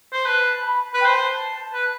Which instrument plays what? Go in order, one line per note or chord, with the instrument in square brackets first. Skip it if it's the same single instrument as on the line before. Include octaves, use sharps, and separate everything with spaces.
[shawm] C5
[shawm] B4 [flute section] A5
[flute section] B5
[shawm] B4
[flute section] G5
[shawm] C5 [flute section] A5
[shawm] B4